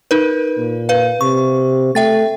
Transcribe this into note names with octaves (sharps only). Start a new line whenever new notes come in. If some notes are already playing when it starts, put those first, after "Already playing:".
D#4 A#4 B4
A#2
B4 F5
C3 C#6
A3 E5 G5 A6